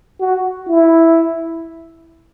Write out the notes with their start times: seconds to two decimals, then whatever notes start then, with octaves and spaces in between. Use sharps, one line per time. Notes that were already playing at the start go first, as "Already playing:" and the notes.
0.20 F#4
0.67 E4